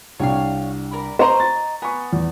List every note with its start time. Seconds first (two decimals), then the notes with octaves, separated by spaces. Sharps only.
0.20 C2 D4 C#5 F5 G5
0.91 A#4 D5 B5
1.19 C5 D#5 A#5 C#6
1.40 A6
1.82 B3 G#5 C#6
2.13 E2